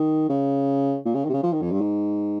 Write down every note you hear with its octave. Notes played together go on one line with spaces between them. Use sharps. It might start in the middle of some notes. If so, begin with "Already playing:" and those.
Already playing: D#3
C#3
A#2
C#3
D#3
C3
C#3
F3
D#3
F2
G2
G#2